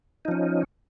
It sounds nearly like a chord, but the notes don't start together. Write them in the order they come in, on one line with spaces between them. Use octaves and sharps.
D#4 F3 C#4